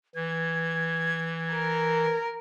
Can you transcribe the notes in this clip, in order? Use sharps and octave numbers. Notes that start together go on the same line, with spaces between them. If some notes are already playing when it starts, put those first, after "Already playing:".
E3 G#6
A#4